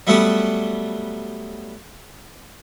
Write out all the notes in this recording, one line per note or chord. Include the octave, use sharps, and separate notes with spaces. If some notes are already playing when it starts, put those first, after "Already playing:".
F#3 G3 A3 B3 F#4 G4